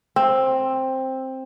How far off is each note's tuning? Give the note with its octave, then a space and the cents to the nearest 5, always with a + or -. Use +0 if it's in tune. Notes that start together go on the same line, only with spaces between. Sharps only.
C4 +10